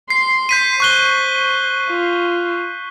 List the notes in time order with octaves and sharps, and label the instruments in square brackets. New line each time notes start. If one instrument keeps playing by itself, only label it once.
[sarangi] C6 [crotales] C7
[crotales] G6 B6 D#7
[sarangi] C5 [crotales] C#6 F#6 G7
[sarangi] F4